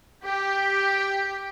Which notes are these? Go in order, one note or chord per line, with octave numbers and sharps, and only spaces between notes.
G4